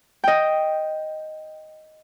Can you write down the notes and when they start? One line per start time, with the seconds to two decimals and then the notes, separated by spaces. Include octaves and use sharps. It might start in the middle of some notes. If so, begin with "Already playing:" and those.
0.24 D#5 G5